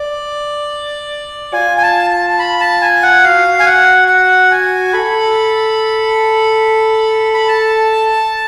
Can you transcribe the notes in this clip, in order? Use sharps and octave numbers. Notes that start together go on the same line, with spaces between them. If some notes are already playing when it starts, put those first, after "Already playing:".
Already playing: D5
F4 G#5
G#5
A5
A5
A5
B5
A5
G#5
F#5
F#4 F5
G#5
F#5
F#5
G#5
A4 B5
B5
A5